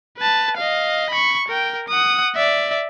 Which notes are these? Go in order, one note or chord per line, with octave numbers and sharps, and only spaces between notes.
B4 A5
D#5 F5
B5 C#6
A#4 G5
F#5 D#6
D5 E5